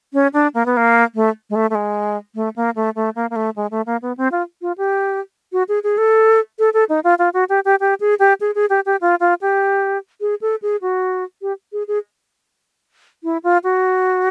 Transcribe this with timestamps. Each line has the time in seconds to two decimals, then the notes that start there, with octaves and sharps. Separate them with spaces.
0.13 C#4
0.33 D4
0.54 A#3
0.66 B3
0.77 A#3
1.15 A3
1.50 G#3
1.56 A3
1.70 A3
1.75 G#3
2.35 A3
2.56 A#3
2.76 A3
2.96 A3
3.16 A#3
3.30 A#3
3.36 A3
3.56 G#3
3.71 A3
3.86 A#3
4.02 B3
4.17 C4
4.32 F4
4.62 F4
4.78 G4
5.52 F#4
5.69 G#4
5.84 G#4
5.98 A4
6.59 A4
6.74 A4
6.89 D#4
7.04 F4
7.19 F4
7.34 F#4
7.49 G4
7.65 G4
7.80 G4
8.00 G#4
8.19 G4
8.41 G#4
8.55 G#4
8.70 G4
8.86 G4
9.01 F4
9.20 F4
9.41 G4
10.21 G#4
10.41 A4
10.62 G#4
10.82 F#4
11.42 G4
11.73 G#4
11.88 G#4
13.24 E4
13.44 F4
13.64 F#4